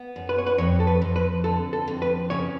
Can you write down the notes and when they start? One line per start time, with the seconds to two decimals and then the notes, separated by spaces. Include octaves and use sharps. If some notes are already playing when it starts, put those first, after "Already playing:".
Already playing: B3
0.16 F#2
0.29 B4
0.38 C#5
0.47 B4
0.58 F2 C#5
0.80 A4
0.87 B4
1.02 F2
1.16 B4
1.44 D3 A4
1.73 A4
1.87 F2
2.02 B4
2.30 C#3 C#5